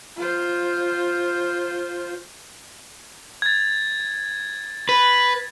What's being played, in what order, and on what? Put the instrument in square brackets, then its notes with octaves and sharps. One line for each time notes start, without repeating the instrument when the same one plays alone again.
[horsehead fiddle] F4 C5
[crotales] G#6 A6
[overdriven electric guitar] B4